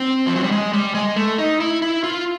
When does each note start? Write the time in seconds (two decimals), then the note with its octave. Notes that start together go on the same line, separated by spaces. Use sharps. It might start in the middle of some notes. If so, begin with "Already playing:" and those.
Already playing: C4
0.27 F3
0.35 F#3
0.43 G3
0.51 G#3
0.73 G3
0.94 G#3
1.16 A3
1.38 D#4
1.60 E4
1.82 E4
2.04 F4